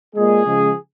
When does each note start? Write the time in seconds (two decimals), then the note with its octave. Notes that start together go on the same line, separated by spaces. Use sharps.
0.15 A#2 G#3 G#4
0.44 C#3 F3 G#3